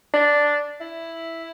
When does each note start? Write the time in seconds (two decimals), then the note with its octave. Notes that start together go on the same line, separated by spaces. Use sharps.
0.14 D4
0.81 E4